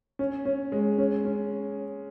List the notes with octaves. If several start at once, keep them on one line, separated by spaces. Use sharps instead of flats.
C#4
C#4
G#3
C#4
C#4